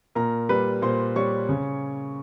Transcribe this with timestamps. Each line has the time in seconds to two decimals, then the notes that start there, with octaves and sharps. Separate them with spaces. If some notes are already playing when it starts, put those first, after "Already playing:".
0.15 A#2 A#4 A#5
0.49 G3 B4 B5
0.82 A#2 C5 C6
1.16 G3 C#5 C#6
1.49 C#3